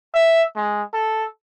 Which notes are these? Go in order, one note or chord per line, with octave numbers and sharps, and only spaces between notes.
E5
G#3
A4